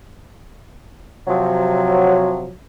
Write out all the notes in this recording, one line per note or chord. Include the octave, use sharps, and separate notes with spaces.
C3 F3 F#3